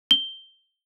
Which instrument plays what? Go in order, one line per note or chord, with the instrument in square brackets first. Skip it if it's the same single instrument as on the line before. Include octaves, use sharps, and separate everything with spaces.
[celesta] G7